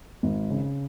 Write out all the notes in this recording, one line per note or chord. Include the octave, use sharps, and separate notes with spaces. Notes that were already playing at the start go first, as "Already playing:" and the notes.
G#1
C#3